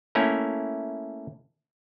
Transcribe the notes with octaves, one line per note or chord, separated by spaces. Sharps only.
A3 A#3 C#4 E4